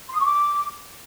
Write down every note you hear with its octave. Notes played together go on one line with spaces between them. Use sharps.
C6
D#6
C#6
D6